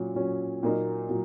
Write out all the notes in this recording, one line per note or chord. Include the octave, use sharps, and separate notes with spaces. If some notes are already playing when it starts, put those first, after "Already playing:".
Already playing: A#2 F#3 C#4
A#2 F#3 C#4
A#2 F#3 A#3 D#4
A#2 F#3